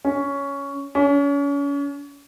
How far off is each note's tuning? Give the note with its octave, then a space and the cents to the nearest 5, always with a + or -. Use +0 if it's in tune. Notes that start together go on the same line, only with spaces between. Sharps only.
C#4 +10
C#4 +35